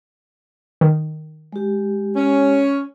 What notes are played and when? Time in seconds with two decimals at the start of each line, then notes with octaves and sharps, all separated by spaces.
0.81 D#3
1.53 G#3 G4
2.16 C#4